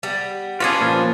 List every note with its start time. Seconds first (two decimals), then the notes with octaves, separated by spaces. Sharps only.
0.03 G3 B3
0.60 C#4 D4 F4 F#4 G#4 B4
0.81 A#2 F3